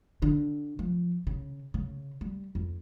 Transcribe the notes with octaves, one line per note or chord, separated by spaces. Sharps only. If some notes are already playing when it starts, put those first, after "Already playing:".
D3
F3
C#3
C#3
G3
F2